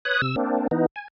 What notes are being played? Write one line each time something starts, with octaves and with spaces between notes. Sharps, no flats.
B4 C#5 D#6 F#6
C3 E6
A#3 C4 D4
E3 B3 D#4
G#5